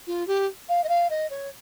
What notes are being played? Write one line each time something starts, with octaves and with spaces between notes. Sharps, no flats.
F4
G4
F5
D#5
F5
D#5
C#5